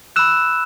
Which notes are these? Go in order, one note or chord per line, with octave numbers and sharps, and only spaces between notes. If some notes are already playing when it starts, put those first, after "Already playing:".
B5 E6 F#6 E7